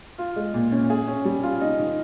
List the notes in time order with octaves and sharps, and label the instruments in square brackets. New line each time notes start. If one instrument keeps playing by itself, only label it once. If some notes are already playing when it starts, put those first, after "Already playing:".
[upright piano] F4
G#3
A#2
C#4
G#4
C#4
G3
F4
D#4
D#3